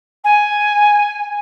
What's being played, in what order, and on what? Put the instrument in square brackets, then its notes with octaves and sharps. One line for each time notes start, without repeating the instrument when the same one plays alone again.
[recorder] G#5